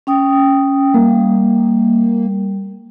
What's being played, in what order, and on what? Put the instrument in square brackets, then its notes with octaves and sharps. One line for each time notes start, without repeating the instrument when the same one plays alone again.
[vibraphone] C#4 G5 D#6
[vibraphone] G3 [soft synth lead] A#3